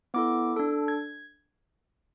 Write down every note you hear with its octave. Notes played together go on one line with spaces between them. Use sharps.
B3 E4 A4 D6
D4 A4
G#6